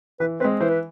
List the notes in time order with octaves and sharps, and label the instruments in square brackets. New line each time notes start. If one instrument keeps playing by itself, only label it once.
[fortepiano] E3 [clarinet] B4
[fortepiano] C4 [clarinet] B4
[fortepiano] G#3
[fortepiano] E3 [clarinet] C5
[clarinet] B4